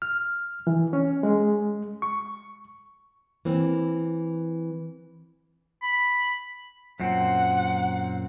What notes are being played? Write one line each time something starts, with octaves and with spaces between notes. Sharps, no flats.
F6
E3
C#4
G#3
C#6
E3 A#3 C4
B5
F#2 A#2 C4 F#5